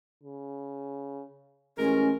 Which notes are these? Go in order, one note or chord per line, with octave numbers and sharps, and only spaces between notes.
C#3
A1 G#3 C#4 A#4